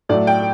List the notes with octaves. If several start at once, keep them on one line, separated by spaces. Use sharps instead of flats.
A2 F#3 A3 D5
G5